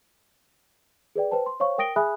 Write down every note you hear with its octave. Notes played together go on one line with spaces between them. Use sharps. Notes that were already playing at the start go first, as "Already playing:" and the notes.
G#4 B4 D5 G5
B4 C5 G5 A5
C6
C5 C#5 F5 C#6
A#4 G5 D#6 A#6 D7 G7
G#4 E5 G#5 B5 D#6 F#6